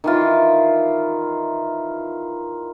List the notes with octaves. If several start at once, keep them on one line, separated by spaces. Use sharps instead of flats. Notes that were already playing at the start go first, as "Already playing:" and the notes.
D#3 E3 F4